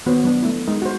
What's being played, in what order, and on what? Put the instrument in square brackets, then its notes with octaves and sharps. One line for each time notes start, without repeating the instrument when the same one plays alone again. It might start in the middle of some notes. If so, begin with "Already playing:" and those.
[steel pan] D#3 B3 F#4 C5 C#5
F#3 B3 D4
A3 E4
G#3 D#4 A#4
F#4 C5